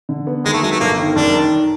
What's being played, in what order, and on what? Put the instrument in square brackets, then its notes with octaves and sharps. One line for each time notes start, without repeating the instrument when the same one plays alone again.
[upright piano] D3
B3
[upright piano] D#2 [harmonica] G#3
[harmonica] A3
[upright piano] F#3 [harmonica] G#3
[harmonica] A3
[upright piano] G1 [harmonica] A#3
[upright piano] D#3
[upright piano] F#1 [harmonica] D4
[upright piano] D#3